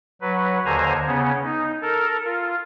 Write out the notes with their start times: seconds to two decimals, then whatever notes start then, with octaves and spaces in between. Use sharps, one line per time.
0.21 F#3 B4
0.65 D#2 D3 C5 G#5 A#5
1.07 C#3 B3 C#4
1.44 D#4
1.82 A4 A#4
2.25 F4